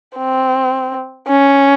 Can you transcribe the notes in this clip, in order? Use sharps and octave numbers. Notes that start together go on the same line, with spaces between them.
C4
C#4